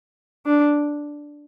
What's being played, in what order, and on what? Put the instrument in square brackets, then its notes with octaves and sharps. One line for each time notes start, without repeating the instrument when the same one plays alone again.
[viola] D4